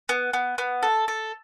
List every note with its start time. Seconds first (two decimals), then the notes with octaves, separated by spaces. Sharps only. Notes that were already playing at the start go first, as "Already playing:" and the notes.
0.09 B3
0.33 B3
0.58 B3
0.83 A4
1.08 A4